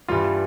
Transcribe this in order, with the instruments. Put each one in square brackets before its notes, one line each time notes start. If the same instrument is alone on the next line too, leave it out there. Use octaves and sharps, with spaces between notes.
[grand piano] G2 E3 G3 F4 F5